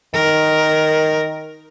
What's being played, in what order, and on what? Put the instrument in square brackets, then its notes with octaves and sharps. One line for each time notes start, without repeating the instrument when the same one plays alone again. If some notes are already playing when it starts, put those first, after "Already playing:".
[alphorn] D#3 [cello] A#4